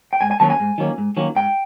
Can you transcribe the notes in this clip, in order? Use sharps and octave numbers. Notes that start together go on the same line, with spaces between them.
G5
G#2 G#5
G#5
D#3 F#3 A#3 C#4 A5
G#5
G#2
D#3 F#3 A#3 C#4
G#2
D#3 F#3 A#3 C#4
G#2 G5